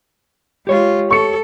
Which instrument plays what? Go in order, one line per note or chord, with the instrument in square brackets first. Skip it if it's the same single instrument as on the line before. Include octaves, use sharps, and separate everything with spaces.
[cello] G#3 F4 [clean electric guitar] G4 C#5
[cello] A4 [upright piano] C#6 C#7